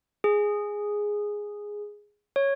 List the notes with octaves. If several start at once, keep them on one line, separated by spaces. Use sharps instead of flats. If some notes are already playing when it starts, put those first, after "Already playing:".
G#4
C#5